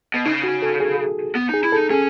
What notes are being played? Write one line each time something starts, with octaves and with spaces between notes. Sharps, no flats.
B2
C#3 D#4
F#4
A4
G#4
B3
D#4
G#4
E4
A4
D#4
C#4 G#4